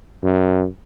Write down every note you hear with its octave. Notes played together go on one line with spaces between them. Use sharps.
F#2